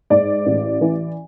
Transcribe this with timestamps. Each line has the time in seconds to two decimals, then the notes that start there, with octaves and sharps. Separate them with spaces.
0.10 G#2 D5
0.46 A1
0.81 E3